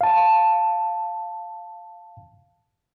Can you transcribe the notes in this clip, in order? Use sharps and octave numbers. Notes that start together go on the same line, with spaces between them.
F5 A5